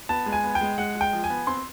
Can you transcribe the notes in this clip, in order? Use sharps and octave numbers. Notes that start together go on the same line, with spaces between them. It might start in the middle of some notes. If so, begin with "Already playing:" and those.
B3 A5
G#3
G#5
B3
G5
G#3
G#3 F#5
G#3
G5
F3
G#5
B3
C4 C6